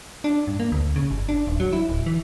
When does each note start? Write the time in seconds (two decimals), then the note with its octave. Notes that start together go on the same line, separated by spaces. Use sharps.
0.24 D4
0.47 G2
0.60 A#3
0.72 D2
0.96 C#3
1.11 G1
1.29 D4
1.47 D#1
1.60 F#3
1.73 E4
1.89 D1
2.06 E3